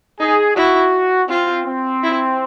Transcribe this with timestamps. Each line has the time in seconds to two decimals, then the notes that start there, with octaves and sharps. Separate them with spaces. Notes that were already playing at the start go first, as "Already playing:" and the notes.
0.19 D#4 G#4
0.56 E4 F#4
1.29 C4 F4
1.66 C4
2.03 E4